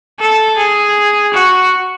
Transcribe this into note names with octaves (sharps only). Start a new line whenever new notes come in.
A4
G#4
F#4